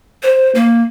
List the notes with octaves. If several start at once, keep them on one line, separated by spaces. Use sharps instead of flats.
C5
A#3